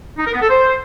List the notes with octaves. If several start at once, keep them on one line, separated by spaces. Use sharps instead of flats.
D#4
A#4
B3
A4
C5